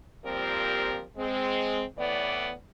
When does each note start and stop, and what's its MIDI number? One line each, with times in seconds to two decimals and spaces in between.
0.24 1.03 46
0.24 1.03 53
0.24 1.03 55
0.24 1.03 60
0.24 1.03 67
0.24 1.03 70
1.18 1.83 56
1.18 1.83 60
1.98 2.52 45
1.98 2.52 52
1.98 2.52 59
1.98 2.52 74